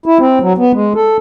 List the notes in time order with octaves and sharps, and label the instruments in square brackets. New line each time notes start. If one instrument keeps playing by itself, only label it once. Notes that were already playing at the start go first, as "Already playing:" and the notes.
[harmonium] E4
C4
F#3
B3
G#3
A4